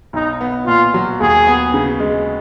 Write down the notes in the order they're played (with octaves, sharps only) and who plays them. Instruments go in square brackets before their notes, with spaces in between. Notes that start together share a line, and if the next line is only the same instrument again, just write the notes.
[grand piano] B1 [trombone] D#4
[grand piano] B3
[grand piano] A#2 [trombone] F4
[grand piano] F#3
[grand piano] D#2 [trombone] G#4
[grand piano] B3
C#3
G#3